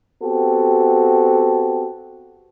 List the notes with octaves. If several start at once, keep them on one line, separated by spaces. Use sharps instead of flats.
B3 C4 F#4 G4 A4